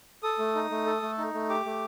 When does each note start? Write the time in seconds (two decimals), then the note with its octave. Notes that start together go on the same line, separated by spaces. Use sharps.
0.23 A4 D#6
0.39 A3
0.55 D#4
0.70 A3
0.86 A4
1.02 A3
1.18 D#4
1.34 A3
1.49 G4 D6
1.65 A3